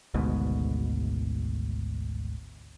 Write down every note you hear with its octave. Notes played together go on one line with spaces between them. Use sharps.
G#1 D2 G#2 B2